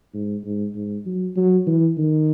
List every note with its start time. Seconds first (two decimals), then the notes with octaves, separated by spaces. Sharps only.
0.14 G#2
0.44 G#2
0.75 G#2
1.06 F#3
1.36 F#3
1.67 E3
1.98 D#3